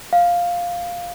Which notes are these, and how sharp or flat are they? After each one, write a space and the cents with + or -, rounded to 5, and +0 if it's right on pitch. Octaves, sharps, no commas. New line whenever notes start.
F5 +5